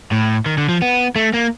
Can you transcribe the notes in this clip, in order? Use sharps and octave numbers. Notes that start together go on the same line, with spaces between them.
A2
D#3
D3
F3
B3
A3
A#3